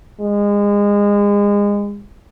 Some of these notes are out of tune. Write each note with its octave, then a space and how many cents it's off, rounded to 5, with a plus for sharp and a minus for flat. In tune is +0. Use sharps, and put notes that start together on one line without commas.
G#3 -30